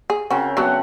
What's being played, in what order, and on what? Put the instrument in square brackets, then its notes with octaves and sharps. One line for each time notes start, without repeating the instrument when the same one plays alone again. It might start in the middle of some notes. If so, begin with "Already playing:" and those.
[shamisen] G#4
[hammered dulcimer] C#3 C4 A#4 [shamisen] F#4
[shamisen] F#3 B3 D4 [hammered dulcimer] A3 F#5